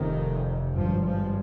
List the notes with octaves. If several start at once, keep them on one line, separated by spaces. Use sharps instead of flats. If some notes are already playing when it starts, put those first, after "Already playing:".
Already playing: F1 F2 C3 D#3
G#1 G2 F3
F3